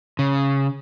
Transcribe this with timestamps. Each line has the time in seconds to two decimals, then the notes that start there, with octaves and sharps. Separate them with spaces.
0.19 C#3